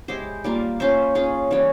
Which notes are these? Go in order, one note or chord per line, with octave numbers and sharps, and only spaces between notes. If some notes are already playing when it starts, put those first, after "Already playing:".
G#3 E4 G4 C5
G3 A#3 F4
C#4 F4 C5 E5
C#4 F4 G#4
E3 G3 C#4